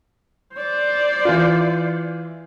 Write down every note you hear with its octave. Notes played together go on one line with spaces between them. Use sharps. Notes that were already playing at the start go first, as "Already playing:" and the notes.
C5 D5
E3 F4